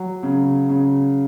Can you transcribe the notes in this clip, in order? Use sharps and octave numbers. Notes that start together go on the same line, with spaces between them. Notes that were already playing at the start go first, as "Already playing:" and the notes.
Already playing: F#3
C#3
C#3